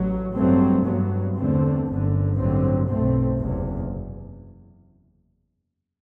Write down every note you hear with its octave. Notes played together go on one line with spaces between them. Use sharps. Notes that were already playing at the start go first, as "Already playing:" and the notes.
Already playing: A1 F#3
G2 F#3 A3 C4
G2 F#3 B3
E2 D3 A3 C4
G1 F#2 D3
A1 G2 D3 F#3 C4
B1 B2 A3 C4
F#1 E2 C3